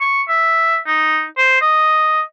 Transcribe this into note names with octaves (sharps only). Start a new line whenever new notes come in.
C#6
E5
D#4
C5
D#5